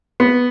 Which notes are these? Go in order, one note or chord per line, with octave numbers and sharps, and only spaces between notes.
B3